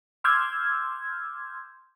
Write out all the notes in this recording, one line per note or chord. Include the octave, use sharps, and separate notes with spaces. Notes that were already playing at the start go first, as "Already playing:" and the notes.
C6 D6 E6 F6 G6 G#6